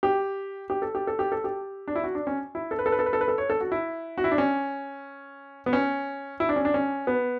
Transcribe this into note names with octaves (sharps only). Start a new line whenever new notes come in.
G4
G4
A4
G4
A4
G4
A4
G4
D4
E4
F#4
D4
C#4
E4
A4
B4
A4
B4
A4
B4
A4
B4
A4
C#5
A4
F#4
E4
F#4
E4
D4
C#4
B3
C#4
E4
D4
C#4
D4
C#4
B3